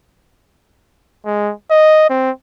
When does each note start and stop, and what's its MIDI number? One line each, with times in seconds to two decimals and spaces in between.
1.26 1.53 56
1.71 2.06 75
2.10 2.31 60